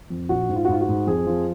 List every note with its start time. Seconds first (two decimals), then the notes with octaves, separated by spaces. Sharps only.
0.10 F2
0.29 A#1 F#4
0.49 G#2
0.56 F4
0.65 F#4
0.68 G#2 F4
0.81 F#4
0.89 G#2
1.07 F2 G#4
1.27 F3